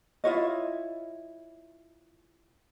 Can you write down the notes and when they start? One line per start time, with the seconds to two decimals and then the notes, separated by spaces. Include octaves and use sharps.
0.24 E4 F4 C#5 D#5